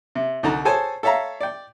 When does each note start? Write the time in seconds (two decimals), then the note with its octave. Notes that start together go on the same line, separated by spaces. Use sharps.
0.15 C3
0.43 C2 D3 D#4 A5 A#5
0.65 G#4 A4 C5 C#5 G#5 A5
1.03 A4 C#5 E5 F5 A#5
1.41 D5 G5